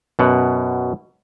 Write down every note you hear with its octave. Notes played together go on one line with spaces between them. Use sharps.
F#2 B2 F#5